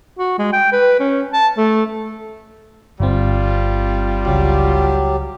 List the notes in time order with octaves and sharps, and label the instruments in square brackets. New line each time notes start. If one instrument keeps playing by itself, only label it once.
[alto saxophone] F#4
G#3
G5
B4
C#4
A5
A3
[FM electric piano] G1 C4 [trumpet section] G3 F4
[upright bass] C#2 [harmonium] F#3 G4